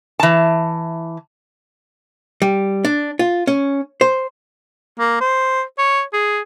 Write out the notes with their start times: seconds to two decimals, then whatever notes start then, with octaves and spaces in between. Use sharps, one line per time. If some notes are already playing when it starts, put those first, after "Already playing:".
0.20 E3 A5
2.42 G3
2.85 D4
3.19 F4
3.47 C#4
4.01 C5
4.99 A#3
5.20 C5
5.78 C#5
6.13 G#4